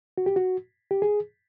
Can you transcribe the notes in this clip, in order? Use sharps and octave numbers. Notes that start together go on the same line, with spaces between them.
F#4
G4
F#4
G4
G#4